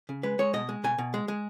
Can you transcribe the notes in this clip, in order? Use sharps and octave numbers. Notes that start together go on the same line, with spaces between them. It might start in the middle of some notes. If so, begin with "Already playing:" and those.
C#3
G#3 B4
G#3 C#5
B2 D#5
G#3
B2 G#5
B2
G#3
G#3